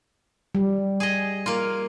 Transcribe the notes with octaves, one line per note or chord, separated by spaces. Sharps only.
G3
G#4 D#5
A#3 F4